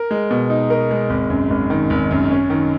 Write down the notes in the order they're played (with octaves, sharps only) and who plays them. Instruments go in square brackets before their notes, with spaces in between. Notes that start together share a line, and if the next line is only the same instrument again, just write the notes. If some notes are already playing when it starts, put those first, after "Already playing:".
Already playing: [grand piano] A#4
G#3
B2
D#4
A#4
G#3
G#1
F#2
G#1
D#3
G#1
F#2
C#4
D#3